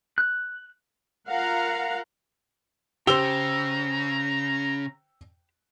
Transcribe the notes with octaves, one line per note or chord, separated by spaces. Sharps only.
F#6
F4 A#4 F5 F#5 A#5
C#3 G4 C5 A#5 E6 F7 G7